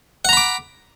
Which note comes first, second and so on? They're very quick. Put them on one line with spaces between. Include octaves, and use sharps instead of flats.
F#5 A#5 B5 D6